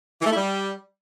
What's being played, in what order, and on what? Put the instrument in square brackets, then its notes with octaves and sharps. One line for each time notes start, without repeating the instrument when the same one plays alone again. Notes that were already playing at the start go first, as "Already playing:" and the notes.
[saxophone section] E3
A3
E4
G3